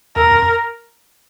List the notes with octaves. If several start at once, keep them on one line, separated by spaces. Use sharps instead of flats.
E2 A#4
F2